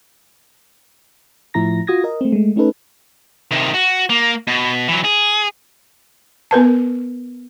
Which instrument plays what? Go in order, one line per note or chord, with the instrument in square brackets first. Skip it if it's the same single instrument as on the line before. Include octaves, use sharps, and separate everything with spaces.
[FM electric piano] A2 F3 E4 A#5 A#6
F4 F#4 D#6 G#6 A#6
A#4 D#5
A3 C4
G#3 A3
A3 C#4 D#4 A4 B4
[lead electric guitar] C3 D#3
F#4
A#3
B2
E3 F#3
G#4
[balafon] B3 A#4 B4 A5